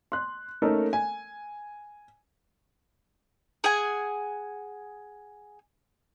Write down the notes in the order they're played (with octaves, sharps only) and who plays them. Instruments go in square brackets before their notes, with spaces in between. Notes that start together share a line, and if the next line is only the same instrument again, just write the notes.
[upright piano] C6 F#6
A3 A#3 C#4 D#4 A4 A#4
G#5
[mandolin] G#4 F#5 G#5